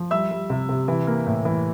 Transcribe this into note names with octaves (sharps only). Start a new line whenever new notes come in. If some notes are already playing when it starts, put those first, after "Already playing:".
Already playing: F3
G3 E5 E6
G3
C3
C3
E3
A#3
A2
E3